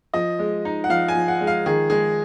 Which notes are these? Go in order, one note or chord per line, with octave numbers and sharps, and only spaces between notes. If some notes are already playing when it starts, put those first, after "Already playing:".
F3 D#5
G#3
D#4
F#5
F3 F5
G#5
F3
F#5
G#3
F5
D#3 G#4
G#3 G#4